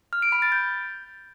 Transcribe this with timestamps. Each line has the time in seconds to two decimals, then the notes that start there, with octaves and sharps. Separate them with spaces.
0.13 F6
0.22 D7
0.32 B5
0.42 A6
0.52 G6